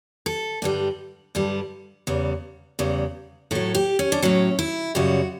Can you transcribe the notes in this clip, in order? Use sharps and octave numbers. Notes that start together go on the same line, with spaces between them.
A4
G2 D3 G3
G2 D3 G3
E2 C#3 G3
E2 C#3 G3
A2 F#3 A4
G4
C#4
D4
A2 F#3 C#4
E4
F#2 C#3 G3 F#4